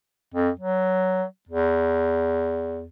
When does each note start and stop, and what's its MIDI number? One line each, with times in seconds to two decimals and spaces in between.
0.34 0.50 41
0.60 1.24 54
1.49 2.86 40